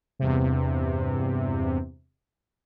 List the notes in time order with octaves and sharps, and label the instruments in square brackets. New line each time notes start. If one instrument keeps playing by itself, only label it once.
[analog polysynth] E2 G2 C3